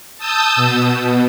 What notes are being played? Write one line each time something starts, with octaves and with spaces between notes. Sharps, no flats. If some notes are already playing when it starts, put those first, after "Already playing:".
A5 D#6 E6 G6
B2